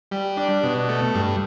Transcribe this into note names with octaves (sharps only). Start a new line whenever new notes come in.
G3
D4
B2
A3
G2